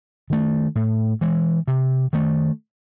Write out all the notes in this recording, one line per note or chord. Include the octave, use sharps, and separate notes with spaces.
D#3 A3
A2
E3 G#3
C3
D#3 A3